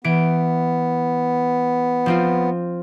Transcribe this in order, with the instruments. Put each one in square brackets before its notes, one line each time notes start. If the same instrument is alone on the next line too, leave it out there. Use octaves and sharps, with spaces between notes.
[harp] E3 D7 [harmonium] B3
[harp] F3 C4 F4